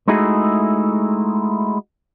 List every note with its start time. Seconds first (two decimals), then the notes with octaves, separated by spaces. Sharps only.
0.08 G#3 A3 D#4 E4 F#4 G#4